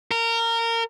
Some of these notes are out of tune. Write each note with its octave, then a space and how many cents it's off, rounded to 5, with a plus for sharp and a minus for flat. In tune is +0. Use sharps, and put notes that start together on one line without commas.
A#4 -20